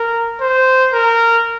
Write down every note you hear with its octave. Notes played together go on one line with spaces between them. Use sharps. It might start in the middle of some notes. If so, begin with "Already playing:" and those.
Already playing: A#4
C5
A#4